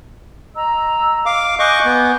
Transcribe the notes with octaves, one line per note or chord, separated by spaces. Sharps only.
D#5 A#5 E6
F5 D6
D#5 G#5 C#6 D6 F#6 G6
B3